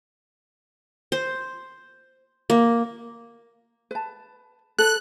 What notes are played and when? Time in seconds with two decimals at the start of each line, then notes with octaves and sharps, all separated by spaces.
1.12 C5
2.50 A#3
3.91 B4 A5
4.79 A4 B4 F#6